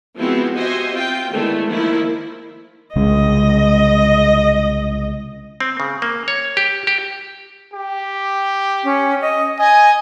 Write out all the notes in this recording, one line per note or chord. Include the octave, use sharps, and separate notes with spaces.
F3 G#3 B3 C4 E4 F#4
F#4 G4 C5 D#5 E5 G#5
C4 F4 G5
D3 D#3 G#3 A3 B3 E4
D#3 F3 A#3 E4
C2 C#3 G#3 D#5
C4
C#3
A#3
C#5
G4
G4
G4
C#4
D#5
D#5 G#5